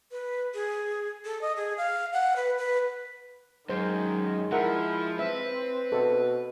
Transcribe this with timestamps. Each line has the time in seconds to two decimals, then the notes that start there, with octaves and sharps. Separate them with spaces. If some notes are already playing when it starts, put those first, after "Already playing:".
0.11 B4
0.54 G#4
1.25 A4
1.41 D#5
1.56 G#4
1.77 F5
2.13 F#5
2.36 B4
2.58 B4
3.69 F#2 D#3 G#3 C5
4.52 F3 E4 A#4 E5 F#5
5.19 C4 B4 E5
5.92 B2 A4